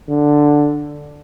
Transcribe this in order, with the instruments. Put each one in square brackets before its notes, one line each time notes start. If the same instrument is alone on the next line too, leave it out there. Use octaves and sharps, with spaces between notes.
[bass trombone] D3